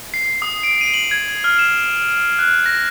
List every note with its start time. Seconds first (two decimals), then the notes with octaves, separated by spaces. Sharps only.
0.14 C7
0.42 D#6
0.63 D7
0.81 D#7
0.94 F#7
1.11 G#6
1.44 F6
1.59 E7
2.39 F#6
2.66 A#6